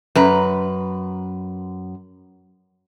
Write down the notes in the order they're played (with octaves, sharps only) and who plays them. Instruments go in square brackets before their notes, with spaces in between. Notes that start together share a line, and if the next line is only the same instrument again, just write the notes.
[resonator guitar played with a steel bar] F#2 B4 A#5